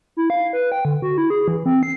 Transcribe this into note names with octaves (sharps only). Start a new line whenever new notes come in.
E4
F5
B4
G5
D3
F#4
E4
G#4
E3
C4
C7